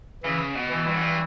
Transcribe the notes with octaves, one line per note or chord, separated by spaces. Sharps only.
C#3 E3
B2
E3
G2
F#2
G2